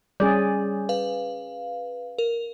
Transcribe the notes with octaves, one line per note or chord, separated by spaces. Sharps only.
G3 C#4 G#4 D5
B4 F5
A#4